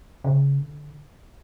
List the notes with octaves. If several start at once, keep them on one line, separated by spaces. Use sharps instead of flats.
C#3
D3